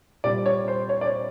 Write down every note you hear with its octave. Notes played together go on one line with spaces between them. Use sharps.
A#2 G3 C4 D5
C#5
C5
C#5
D5
C#5